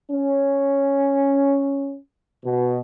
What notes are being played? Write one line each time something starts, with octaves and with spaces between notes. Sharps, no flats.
C#4
B2